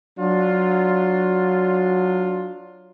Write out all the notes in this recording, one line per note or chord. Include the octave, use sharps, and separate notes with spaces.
F#3 D4 F4